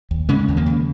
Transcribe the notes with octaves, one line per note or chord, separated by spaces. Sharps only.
D#2
C#3 G#3 C#4
D#2
F3 A#3
C#3